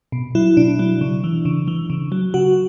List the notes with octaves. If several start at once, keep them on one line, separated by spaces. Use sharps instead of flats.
B2
F#3 E4
B2 D4
F#3
C#3
E3
C#3
E3
C#3
F#3
C#3 F#4